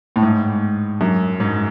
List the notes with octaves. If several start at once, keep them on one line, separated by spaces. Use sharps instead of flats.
A2
G#2
F#2
G#2